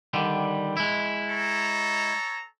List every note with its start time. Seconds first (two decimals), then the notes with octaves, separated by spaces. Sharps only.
0.13 D3 D#3 G3
0.77 G#3 E4
1.29 A4 C#5 A#5